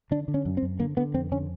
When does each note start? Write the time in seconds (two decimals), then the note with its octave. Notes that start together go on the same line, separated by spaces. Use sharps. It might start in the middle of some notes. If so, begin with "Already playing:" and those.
0.11 D3 D4
0.28 D3
0.34 C#4
0.45 F#2
0.57 C4
0.63 F#2
0.80 D3 A#3
0.97 D3 B3
1.14 F2 C4
1.32 D3 C#4